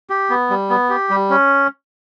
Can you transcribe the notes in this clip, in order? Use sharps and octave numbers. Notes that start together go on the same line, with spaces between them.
G4
B3
G3
B3
G4
G3
C#4